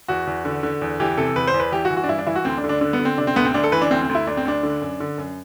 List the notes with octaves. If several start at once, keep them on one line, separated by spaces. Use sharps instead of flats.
E2 F#4
E2
D3
D3
E2
E3 G4
C3 A4
E2 B4
C5
E2
B4
E3 G4
F#4
E3
F#4
D4
G2 E4
D4
E3 E4
F#4
D2 C4
D4
D3
D4
D3 D4
B3
D3
C4
C3 D4
C4
D2 B3
C4
D2 D4
A4
E3 B4
D4
D2 C4
C4
D2
E4
D2 D4
C4
D2 D4
D3
F#2
D3
F#2